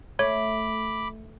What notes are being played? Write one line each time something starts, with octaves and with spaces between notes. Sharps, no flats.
A3 C#5 B5 D6